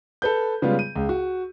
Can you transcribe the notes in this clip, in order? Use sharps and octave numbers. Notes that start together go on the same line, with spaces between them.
A4 B4 G6
C#3 G3 G#3 B3 F4
D#7
C#2
F#4